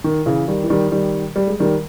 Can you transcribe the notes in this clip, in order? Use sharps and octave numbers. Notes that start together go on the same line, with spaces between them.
D#3
C#3 E3
D#3 G3
E3
D#3 G3
D#3 G3
G3
G#3
D#3 G3